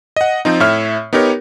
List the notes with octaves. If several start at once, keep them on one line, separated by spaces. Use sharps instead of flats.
D#5 F#5
F3 C4 D#4
A2 C#5 E5 F6
B3 D#4 G4 A#4 C#5